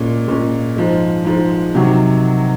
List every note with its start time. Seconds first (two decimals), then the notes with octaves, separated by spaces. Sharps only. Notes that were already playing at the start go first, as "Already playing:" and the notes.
Already playing: A#2 G#3 C#4
0.28 A#2 G#3 C#4
0.77 G#2 F3 G#3
1.25 G#2 F3 G#3
1.75 C3 D#3 F#3